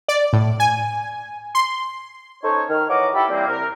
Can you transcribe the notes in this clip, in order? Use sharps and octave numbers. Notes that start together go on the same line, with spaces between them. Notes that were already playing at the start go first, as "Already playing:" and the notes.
D5
A2
G#5
C6
C#4 D#4 A4 C5 C#5
D#3 F6
E3 C#5 D#5 F#5 A#5 D6
E4 G4 A4 B5
E3 G3 A#3 C4
C2 A#4